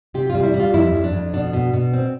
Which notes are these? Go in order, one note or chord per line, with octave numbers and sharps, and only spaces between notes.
C3 G4
F4
G3
E4
G3
F4
F2 E4
F2
D4
F2
B2 D4
B2
B2
C4